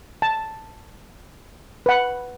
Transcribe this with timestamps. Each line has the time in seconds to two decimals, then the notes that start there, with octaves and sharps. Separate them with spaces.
0.22 A5
1.86 B4 F#5